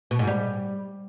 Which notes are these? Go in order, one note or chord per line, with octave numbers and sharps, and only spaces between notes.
B2
G#2
G3